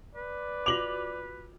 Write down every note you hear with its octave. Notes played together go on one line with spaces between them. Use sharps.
B4 D5
F4 F#4 D6 F7 F#7